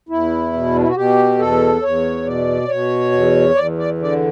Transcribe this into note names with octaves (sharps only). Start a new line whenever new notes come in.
E2 E4
B2
D4
E4
F#4
B2 G4
E2 A4
E2 C#5
B2 D5
B2 C#5
E2
E2 D5
D5
D3 D5